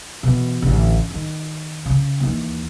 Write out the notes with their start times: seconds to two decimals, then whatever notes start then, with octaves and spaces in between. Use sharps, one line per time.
0.23 B2 E3
0.62 A1 D3
1.11 D#3
1.86 C#3
2.20 D#2 E3